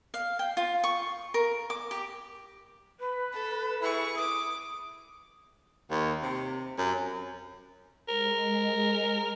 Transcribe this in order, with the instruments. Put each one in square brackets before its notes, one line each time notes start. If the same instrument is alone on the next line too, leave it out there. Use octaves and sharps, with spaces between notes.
[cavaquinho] F5
G5
F4
C#6
A#4
D6
G4
[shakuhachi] B4
[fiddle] A4
[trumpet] E4 [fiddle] G#4 C#6
[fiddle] D6 [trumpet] D#6
[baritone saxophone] D#2
C3
F#2
[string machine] G#3 [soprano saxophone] A#4